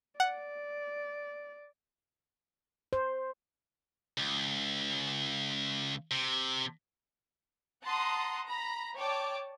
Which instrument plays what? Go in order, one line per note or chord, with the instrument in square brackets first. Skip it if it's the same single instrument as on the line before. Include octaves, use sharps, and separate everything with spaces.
[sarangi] D5 [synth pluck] F#5
[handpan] C5
[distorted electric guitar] C#2
C3
[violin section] F#5 A5 A#5 C6 D#6
A#5 B5
C#5 D5 G5 A5 D6